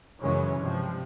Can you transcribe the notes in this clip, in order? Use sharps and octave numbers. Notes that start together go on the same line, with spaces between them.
F#2 C#3 E3 F#3 G#3 C#4
G2 C3 F3